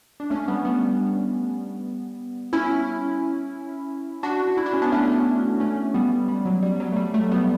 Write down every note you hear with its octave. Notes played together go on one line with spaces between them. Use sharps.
D4
A3 C#4
G3 B3
G3 B3
C#4 E4
D4 F#4
E4
D4
C#4
B3 D4
A3 C#4
A3 C#4
G3 B3
G3
F#3
G3
F#3
A3
G3
F#3 A3
G3 B3